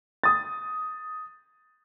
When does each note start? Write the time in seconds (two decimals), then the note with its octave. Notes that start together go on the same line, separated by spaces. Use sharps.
0.24 D#6 A6